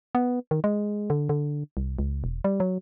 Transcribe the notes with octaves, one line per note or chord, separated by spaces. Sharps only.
B3
D#3
G#3
D3
D3
C2
C#2
E1
G3
F#3